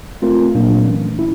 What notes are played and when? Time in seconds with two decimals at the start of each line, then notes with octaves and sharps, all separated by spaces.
0.22 A3 C4 F4 A#4
0.55 A#2 F#3 A#3 D4
0.86 E3 A3 C#4
1.19 E4